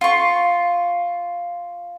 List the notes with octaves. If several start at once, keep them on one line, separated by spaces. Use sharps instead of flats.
F4 C#6